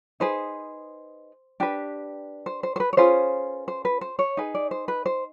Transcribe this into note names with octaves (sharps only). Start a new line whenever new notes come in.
D#4 G#4 B4 C5
D4 G4 B4
C5
C5
C5
B4
C#5
C#4 F4 G#4 B4 C5
C5
B4
C5
C#5
D#4 G#4 B4
D5
C5
B4
C5